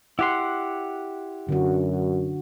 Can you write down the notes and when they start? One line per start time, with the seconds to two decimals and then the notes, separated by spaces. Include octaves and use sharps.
0.19 E4 G4 F#5 C6
1.49 F#2 D3 F#4